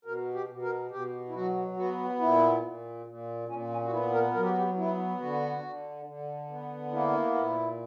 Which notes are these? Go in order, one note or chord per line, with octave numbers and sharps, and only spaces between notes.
B2 A#4
G4
B2
A#4
B2 G4
E4
F#3 F#4
B3 F#4
A#2 E4
A#2
A#2
A#2 C#4
C#4
F#4
B3 E4
A#4
F#3 A#4
G4
F#4
G4
B3 E4
D3 F#4
D3
D3
B3
A#3 E4
A#2